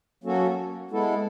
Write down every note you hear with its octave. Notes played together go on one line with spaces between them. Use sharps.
F#3 A#3 C#4 F#4 A4
G#3 B3 E4 A4